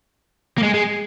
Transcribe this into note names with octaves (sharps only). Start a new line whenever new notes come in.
A#3
G#3
G#3